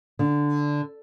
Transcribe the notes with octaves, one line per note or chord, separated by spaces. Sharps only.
D3